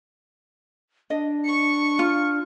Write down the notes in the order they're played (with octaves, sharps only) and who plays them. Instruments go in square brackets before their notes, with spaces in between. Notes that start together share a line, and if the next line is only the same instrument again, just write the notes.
[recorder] D4 [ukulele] D#5
[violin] C#6 C#7
[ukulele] F4